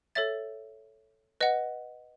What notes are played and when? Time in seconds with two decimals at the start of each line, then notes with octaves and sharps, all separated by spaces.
0.15 A4 C#5 E5 A6
1.41 B4 D#5 F#5